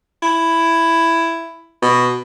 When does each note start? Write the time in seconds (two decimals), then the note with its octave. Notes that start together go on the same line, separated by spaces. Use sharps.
0.23 E4
1.82 B2